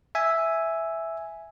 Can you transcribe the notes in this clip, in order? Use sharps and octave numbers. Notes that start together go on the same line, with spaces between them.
E5 G#5